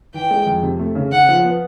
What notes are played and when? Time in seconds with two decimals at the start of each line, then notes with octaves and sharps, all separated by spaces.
0.14 E3 G5
0.31 G#3
0.47 F2
0.63 C3
0.79 A3
0.95 C#3
1.12 C#3 F#5
1.29 F3
1.44 B3